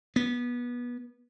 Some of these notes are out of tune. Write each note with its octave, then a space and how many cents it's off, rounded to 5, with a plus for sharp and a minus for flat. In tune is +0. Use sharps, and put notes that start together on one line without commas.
B3 -25